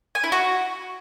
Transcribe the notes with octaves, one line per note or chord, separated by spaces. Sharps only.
G#5
E4
F#4